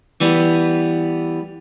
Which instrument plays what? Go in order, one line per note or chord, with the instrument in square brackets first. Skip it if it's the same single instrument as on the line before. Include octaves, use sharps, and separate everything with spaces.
[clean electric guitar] E3 G3 B3